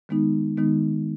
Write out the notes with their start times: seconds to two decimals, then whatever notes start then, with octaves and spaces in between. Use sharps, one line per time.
0.09 D#3 G#3 B3 D#4
0.57 D#3 G#3 B3 D#4